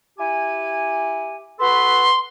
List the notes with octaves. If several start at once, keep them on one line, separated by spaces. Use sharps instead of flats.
E4 G4 G#5
F#4 A4 B4 C6